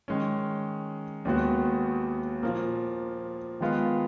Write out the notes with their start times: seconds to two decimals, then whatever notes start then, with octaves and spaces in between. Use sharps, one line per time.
0.08 D#3 G#3 C#4
1.25 D#2 D#3 G#3 B3 F#4
2.43 A#2 F3 A#3
3.60 D#3 G#3 B3 F4